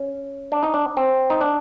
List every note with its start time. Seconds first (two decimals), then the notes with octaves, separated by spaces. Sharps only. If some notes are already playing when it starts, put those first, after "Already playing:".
Already playing: C#4
0.52 D4
0.63 D#4
0.74 D4
0.97 C4
1.30 D#4
1.41 D4